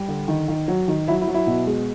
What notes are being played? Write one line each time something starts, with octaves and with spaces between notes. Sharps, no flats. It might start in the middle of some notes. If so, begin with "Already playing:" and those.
Already playing: G3
D3
D#3
D#3
F#3
D#3
F#3 E4
E4
F#3
E4
B2
G#3